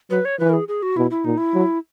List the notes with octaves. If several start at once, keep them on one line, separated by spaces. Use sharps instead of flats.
F#3 B4
C#5
E3 B4
A#4
G#4
G#4
F#4
B2 E4
E4
A#2 D#4
E4
F#3